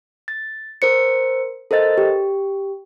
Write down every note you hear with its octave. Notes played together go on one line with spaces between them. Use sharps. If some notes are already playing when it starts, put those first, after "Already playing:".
A6
A#4 C5 C#7
A4 A#4 C5 D#5 A6
G4